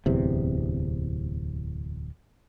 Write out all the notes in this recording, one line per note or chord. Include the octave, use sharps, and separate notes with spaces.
D1 E2 C3